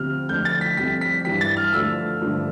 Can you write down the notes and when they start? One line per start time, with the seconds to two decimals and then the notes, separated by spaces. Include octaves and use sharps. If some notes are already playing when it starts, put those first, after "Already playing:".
Already playing: D2 C3 F3 F6
0.29 F2 D3 A3 G6
0.45 A6
0.61 B6
0.77 F2 C3 G3 B6
1.01 B6
1.25 G2 E3 G3 B6
1.41 A6
1.57 F6
1.73 D2 D3 F3 A3 E6
2.21 G2 D3 F3 A3